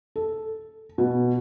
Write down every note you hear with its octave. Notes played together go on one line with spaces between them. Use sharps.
A4
B2